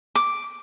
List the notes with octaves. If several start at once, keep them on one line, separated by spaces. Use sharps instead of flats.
D6